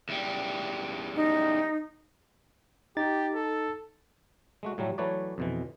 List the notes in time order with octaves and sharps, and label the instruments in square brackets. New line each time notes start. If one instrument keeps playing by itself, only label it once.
[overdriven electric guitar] E2 G3
[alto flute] D#4
[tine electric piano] D#4 A6 [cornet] G4
[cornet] A4
[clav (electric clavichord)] G#3 A3 F#4
A2 F#3 G3 A3
E3 F#3 A3 B4 C#5 D5
F2 B2 E3